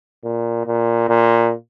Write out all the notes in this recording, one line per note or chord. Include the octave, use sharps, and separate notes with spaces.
A#2
A#2
A#2